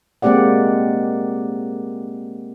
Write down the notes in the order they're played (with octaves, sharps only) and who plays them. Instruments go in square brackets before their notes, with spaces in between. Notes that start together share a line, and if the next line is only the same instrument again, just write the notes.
[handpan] G#3 A#3 C4 G4 D5 F#5